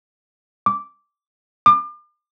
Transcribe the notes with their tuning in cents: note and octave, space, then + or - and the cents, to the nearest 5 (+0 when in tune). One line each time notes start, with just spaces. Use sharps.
D6 -10
D6 +40